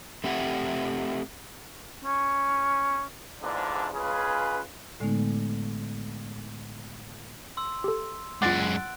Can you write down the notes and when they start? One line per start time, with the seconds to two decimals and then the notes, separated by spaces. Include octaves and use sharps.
0.24 A3 C4 G4 E5 F#5
2.04 C#4
3.42 E2 G#2 D3 F3 D4
3.94 C#2 C#3 F4 G#4 B4
5.00 A2 D3 G#3 A3 B3 D#4
7.57 C6 E6
7.84 G4 A4
8.42 F#2 G#3 F4 F#5 D6 F#6 A6 D7